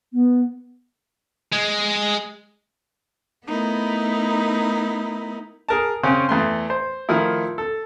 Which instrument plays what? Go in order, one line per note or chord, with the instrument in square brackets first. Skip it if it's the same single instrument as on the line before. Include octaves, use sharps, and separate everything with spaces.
[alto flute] B3
[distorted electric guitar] G#3
[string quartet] A3 B3 D#4 E4 A#4
[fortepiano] G#4 A#4 A5
C#3 C4 C#4
E2 A3 C6
C5
D#3 F3 A3 E4
A4